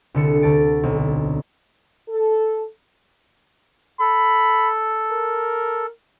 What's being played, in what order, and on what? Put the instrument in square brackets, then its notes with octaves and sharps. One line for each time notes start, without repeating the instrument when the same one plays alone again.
[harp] C2 D3 A4 C#7
D2 A5 D7
B1 C4
[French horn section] A4
[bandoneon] A4 [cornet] B5
[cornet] A#4